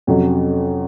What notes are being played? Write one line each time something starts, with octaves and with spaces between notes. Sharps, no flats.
F2 C3 F#3 C#4